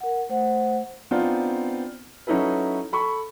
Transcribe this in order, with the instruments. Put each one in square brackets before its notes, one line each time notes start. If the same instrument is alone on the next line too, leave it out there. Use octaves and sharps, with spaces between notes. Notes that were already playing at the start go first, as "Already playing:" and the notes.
[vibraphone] A#4 F#5
A3 C5 F#5
[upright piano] B3 C4 D4 D#4 F4
F#3 C#4 D#4 E4 A4 B4
A4 B5 C#6